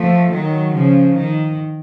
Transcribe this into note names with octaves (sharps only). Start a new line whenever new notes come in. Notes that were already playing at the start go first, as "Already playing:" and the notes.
Already playing: F3 A3
D#3 F#3
C#3 F3
D#3